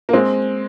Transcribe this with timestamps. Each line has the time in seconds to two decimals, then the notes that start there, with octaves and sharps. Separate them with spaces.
0.09 A#3
0.13 G#3 C4